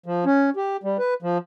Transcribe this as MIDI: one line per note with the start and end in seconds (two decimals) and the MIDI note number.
0.06 0.25 53
0.26 0.50 61
0.56 0.77 67
0.83 0.97 55
0.99 1.14 71
1.22 1.38 53